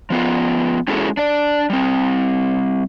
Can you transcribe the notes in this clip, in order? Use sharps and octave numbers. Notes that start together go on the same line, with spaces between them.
F3 B3 F4
G#3 C#4 E4 F#4 G#4 A4
D4 D5
G3 C4